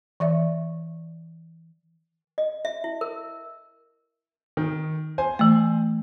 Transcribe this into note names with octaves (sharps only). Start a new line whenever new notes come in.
E3 D5 E5
D#5
E5
E4
A#4
D#3
C5 G#5
E3 A3